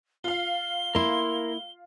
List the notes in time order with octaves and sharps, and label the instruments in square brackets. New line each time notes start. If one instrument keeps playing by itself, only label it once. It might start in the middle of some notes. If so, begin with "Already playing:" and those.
[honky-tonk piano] F4 F5 [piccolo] G7
[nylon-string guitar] A#3 E4 [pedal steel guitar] A#4 C6